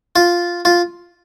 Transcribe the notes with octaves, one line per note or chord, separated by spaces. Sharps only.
F4
F4